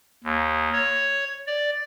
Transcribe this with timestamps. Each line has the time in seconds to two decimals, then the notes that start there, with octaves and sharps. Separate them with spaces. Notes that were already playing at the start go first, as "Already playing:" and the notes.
0.24 D#2
0.73 C#5
1.47 D5